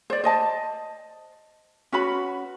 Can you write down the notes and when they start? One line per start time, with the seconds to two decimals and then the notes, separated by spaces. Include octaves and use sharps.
0.10 C5 D5
0.24 C5 D#5 A5
1.92 C#4 F#4 B4 B5